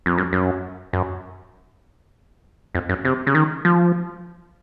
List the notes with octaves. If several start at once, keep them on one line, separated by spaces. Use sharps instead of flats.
F2
F#2
F#2
F#2
F2
F#2
C3
C#3
D#3
F3